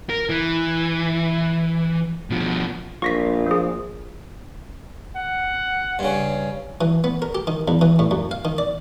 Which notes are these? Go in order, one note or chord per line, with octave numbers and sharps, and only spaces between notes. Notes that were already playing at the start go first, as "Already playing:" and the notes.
A#4
E3
B2 F3
A#1 F4 C#6 A#6 B6
F3 A#3 G#4
F#5
G2 C#3
E3
B3
A#4
G4
D#3
E2
E3
A2
F#2
F5
D#3
D5